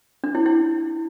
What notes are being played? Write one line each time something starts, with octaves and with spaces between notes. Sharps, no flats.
D4
E4
E4